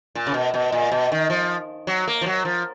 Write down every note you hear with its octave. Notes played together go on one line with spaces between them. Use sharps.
A#2
C#3
B2
B2
A#2
B2
D#3
F3
F#3
A#3
F3
F#3
F3